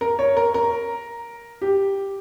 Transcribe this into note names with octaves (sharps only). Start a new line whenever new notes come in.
A#4
C#5
A#4
A#4
G4